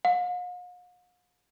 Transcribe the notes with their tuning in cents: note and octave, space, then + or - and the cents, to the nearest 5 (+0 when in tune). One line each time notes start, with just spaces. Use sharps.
F5 +45